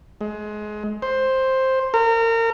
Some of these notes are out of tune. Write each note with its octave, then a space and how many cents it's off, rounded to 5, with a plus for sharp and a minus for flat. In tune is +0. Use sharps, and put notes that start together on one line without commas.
G#3 +25
C5 +5
A#4 -30